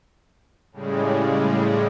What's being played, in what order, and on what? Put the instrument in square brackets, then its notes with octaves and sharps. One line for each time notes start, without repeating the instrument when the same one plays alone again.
[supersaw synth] A2 C#3 G3 G#3